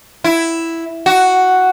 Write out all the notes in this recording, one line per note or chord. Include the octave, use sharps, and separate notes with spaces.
E4
F#4